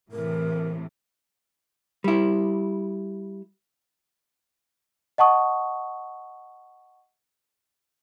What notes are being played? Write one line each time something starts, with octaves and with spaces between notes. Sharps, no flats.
A2 C3 E3 A#4
G3 E4
D#5 F#5 A5 C#6 D#6